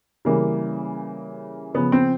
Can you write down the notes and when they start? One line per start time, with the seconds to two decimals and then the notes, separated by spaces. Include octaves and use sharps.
0.25 C#3 E3 G3 A#3
1.74 C#3 F3 B3
1.92 C4